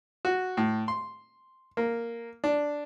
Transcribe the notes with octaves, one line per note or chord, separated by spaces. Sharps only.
F#4
A2
C6
A#3
D4